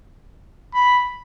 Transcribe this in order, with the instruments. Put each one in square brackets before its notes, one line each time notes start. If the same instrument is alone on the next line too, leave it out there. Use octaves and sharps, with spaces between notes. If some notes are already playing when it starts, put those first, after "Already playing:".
[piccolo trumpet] B5